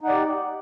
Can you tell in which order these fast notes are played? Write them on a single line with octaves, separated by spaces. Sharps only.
D#4 F#5 D5 G4